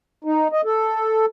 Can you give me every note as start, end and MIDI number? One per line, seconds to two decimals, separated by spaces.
0.24 0.48 63
0.52 0.61 75
0.65 1.26 69